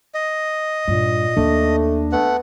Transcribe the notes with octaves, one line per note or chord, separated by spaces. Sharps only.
D#5
G2 A#2
D#2 A3 D4
A3 B3 F#5